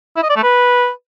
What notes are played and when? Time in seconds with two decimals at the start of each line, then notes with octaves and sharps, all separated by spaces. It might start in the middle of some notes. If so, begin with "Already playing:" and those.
0.16 E4
0.23 D#5
0.30 D5
0.36 A3
0.43 B4